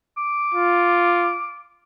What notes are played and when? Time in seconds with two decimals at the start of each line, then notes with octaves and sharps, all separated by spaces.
0.17 D6
0.54 F4